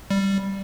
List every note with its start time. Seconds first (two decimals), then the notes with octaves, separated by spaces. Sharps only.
0.11 G3